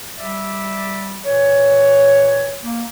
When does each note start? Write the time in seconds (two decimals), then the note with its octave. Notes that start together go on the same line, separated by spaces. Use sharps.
0.17 G3 D5 E5
1.23 A#2 E3 C#5
2.63 A#3